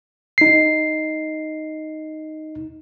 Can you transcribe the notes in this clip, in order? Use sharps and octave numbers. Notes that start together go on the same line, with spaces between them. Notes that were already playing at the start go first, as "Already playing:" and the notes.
D#4 C7